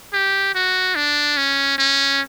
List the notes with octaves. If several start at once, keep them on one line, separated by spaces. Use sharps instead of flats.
G4
F#4
D4
C#4
C#4